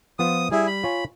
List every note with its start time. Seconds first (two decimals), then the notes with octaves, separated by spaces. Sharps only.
0.19 F3 B3 F4 D#6
0.52 G3 E4 G#4
0.67 B5
0.84 F4 C#5 G#5